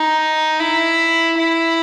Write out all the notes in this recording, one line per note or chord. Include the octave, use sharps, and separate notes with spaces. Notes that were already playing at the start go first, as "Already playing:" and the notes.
Already playing: D#4
E4
E4